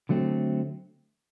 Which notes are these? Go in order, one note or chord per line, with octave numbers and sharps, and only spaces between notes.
D3 F#3 A3 C4